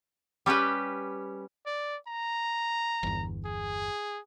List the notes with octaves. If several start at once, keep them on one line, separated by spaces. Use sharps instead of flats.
G3 C#4 G4 B4
D5
A#5
G1 E2
G#4